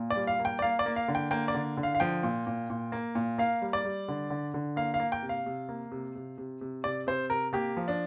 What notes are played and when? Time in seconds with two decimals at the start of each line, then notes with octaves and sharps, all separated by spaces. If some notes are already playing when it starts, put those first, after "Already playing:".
Already playing: A#2 A#3
0.10 D5
0.16 G3
0.27 F5
0.39 A#3
0.45 G5
0.59 D5
0.62 A#3 F5
0.79 D5
0.86 A#3
0.96 F5
1.08 D3
1.15 G5
1.31 A#3 G5
1.48 D5
1.54 D3
1.77 D3
1.83 F5
1.95 F5
2.00 F3 G5
2.23 A#2
2.47 A#2
2.70 A#2
2.92 A#3
3.15 A#2
3.38 A#3 F5
3.62 G3
3.73 D5
3.85 G3
4.08 D3
4.30 D3
4.54 D3
4.76 A#3 F5
4.94 F5
5.00 A#3
5.12 G5
5.22 C3
5.29 F5
5.46 C3
5.69 A#3
5.92 C3
6.15 C3
6.38 C3
6.61 C3
6.84 C3 D5
7.07 C3 C5
7.30 C3 A#4
7.53 A#3 G4
7.77 F3
7.88 D4